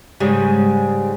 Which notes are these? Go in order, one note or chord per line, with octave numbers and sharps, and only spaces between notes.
G#2 C#3 G3